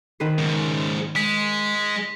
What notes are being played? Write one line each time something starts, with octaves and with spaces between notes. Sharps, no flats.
D#3 B4 C5
G#2 C#3
G#3 B6